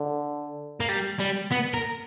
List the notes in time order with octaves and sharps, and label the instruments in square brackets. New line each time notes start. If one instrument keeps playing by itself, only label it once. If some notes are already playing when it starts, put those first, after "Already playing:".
Already playing: [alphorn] D3
[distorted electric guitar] A#3
G3
G3
B3
A#4